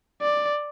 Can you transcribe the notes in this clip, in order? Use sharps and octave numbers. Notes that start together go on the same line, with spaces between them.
D5